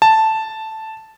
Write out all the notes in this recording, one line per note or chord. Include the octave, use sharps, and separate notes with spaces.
A5